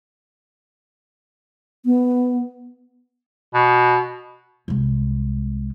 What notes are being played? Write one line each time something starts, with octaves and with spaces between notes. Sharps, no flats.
B3
B2
C2 G#3